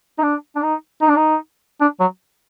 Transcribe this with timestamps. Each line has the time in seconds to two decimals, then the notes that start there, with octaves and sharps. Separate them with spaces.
0.18 D#4
0.23 D4
0.56 D4
0.62 D#4
1.02 D#4
1.08 D4
1.16 D#4
1.81 D4
2.00 F#3